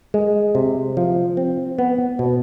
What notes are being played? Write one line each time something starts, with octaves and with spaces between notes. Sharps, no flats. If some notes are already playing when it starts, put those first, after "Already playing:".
G#3
C3
F3
C4
B3
B2